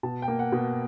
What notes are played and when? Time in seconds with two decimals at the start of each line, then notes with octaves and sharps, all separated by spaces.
0.03 B2 A5
0.22 G5
0.28 A#3
0.39 F#5
0.52 B2